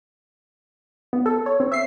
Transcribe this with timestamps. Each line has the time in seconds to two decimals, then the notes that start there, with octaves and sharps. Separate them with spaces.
1.13 B3
1.26 A4
1.46 C#5
1.60 C4
1.72 E5 C7